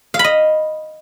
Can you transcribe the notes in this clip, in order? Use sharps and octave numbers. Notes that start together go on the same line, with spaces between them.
F5
B5
D#5